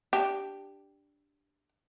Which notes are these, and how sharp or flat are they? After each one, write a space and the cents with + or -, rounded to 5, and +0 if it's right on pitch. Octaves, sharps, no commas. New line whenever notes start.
D4 +0 G4 +0